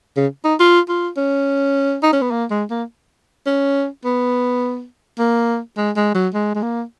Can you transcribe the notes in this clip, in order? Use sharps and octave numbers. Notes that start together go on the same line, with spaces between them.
C#3
D#4
F4
F4
C#4
D#4
C#4
B3
A#3
G#3
A#3
C#4
B3
A#3
G#3
G#3
F#3
G#3
G#3
A#3